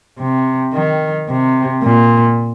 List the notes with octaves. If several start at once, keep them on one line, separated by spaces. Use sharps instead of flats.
C3
D#3
C3
A#2